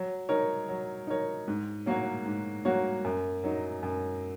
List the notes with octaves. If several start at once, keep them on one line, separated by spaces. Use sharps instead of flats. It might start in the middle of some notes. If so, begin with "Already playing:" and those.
Already playing: F#3
D#4 A#4 C#5
F#3
D#4 A#4 C#5
G#2
F#3 A#3 F#4 C#5
G#2
F#3 A#3 F#4 C#5
F#2
F#3 D#4
F#2